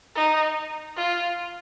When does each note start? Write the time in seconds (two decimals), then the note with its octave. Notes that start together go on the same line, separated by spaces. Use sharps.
0.15 D#4
0.97 F4